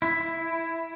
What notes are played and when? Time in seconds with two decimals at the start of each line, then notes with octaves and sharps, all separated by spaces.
0.02 E4